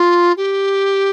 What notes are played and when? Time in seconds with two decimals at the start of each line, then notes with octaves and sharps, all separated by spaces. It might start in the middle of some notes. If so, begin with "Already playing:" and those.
Already playing: F4
0.36 G4